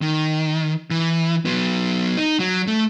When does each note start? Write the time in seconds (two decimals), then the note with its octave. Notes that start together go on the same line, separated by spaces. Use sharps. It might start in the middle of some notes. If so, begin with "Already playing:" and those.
0.02 D#3
0.91 E3
1.45 F#3 B3
2.17 D#4
2.39 F#3
2.67 A3